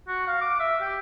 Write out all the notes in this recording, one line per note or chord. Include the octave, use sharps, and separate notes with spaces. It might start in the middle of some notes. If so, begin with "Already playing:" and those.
F#4
F5
D6
E5
G4